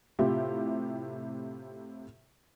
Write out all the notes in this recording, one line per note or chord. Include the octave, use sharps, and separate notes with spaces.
A2 C3 E4 F4 G4